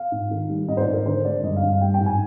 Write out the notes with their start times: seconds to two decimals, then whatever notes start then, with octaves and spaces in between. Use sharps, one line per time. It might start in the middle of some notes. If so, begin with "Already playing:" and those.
Already playing: F5
0.12 G#2
0.31 D#3
0.50 G3
0.68 G#2 D#5
0.77 C5
0.81 D5
0.87 G#2
0.93 A#4
1.06 D3 C5
1.25 G#3 D5
1.43 G2 D#5
1.56 F5
1.63 G2
1.69 F5
1.81 G3 G5
1.94 G5
2.01 G#2
2.06 G#5